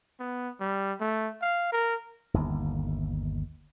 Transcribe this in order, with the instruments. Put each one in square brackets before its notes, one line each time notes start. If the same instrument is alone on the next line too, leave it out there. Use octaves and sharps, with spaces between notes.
[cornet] B3
G3
A3
F5
A#4
[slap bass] G1 D#2